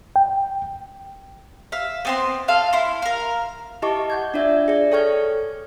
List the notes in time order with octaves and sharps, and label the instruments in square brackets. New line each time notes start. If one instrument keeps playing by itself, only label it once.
[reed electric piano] G5
[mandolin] E5 F5
B3 C4 C6
F4 A4 F5
E4 C6
A#4 F5
[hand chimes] E4 G4 D#5 A5 C#6 D6
F#5 G6 G#6
D4 F4 D5 E5
G#4 D5
A4 C#5 G5 C#6 F6 G#6